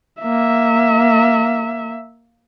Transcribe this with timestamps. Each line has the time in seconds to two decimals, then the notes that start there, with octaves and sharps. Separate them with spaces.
0.21 A#3 E5